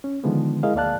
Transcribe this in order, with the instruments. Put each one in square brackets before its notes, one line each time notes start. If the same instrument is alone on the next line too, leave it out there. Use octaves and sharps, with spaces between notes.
[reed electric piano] C#4
D3 D#3 F3 G#3 B3
G#3 E4 G#4 A#4 D#5 F5
D2 A#3 D5 F5 A5 F#6